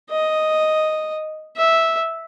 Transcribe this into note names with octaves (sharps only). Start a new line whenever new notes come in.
D#5
E5